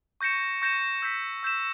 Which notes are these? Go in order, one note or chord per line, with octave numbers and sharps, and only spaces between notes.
C#6 G6 A#6 C#7 E7
C#6 G6 A#6 C#7 E7
E6 G6 B6 E7
E6 G6 B6 E7